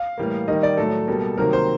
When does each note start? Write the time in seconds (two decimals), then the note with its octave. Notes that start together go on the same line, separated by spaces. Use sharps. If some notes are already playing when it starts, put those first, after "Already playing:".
Already playing: F5
0.18 A2 E3 G3 A#3
0.48 D#3 G3 A#3 D#5
0.63 D5
0.77 A2 F#3 A3 A4
1.08 B2 G3 A#3
1.37 C3 D#3 F#3 A#3 A#4
1.53 C5